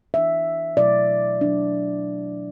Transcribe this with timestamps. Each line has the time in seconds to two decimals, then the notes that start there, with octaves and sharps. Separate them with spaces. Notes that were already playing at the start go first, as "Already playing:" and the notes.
0.14 E3 D4 E5
0.77 B2 F#3 A3 E4 D5
1.41 F#3 D4